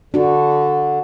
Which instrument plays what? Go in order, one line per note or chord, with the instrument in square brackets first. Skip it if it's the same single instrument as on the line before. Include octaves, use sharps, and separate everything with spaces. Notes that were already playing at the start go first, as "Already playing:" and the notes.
[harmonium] D3 [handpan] D4 F#4